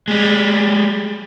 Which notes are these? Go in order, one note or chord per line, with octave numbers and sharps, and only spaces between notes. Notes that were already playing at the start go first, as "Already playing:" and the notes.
G3 G#3